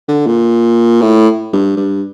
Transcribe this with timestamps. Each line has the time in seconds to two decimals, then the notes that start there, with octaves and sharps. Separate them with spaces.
0.08 D3
0.27 A#2
1.02 A2
1.53 G2
1.77 G2